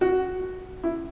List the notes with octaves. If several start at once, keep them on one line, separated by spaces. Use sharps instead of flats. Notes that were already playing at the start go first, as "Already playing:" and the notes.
F#4
E4